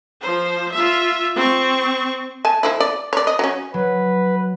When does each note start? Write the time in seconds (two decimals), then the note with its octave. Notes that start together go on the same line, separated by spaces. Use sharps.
0.21 F3 C5
0.72 F4 E5
1.35 C4 C#6
2.45 G#5 A5
2.63 D#3 F3 E4
2.80 D5
3.13 C#5 D5
3.27 D#5
3.39 F#3 C#4
3.74 F#3 B4